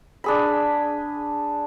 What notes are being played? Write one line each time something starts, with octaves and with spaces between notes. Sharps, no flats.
D4 G#4 B5